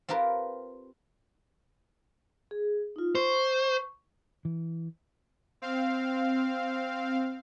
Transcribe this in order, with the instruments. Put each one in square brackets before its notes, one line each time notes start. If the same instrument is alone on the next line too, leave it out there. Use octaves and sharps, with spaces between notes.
[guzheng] C4 F4 G4 A#4 B4
[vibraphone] G#4
D#4 F4
[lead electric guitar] C5 [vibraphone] C#6
[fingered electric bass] E3
[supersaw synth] C4 F5